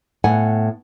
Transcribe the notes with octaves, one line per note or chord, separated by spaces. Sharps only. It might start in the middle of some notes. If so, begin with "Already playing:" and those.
A2 B3 F#5 G#5